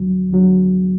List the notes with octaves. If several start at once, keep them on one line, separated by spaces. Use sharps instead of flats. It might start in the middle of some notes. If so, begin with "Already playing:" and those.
Already playing: D2 D3 F#3
D2 D3 F#3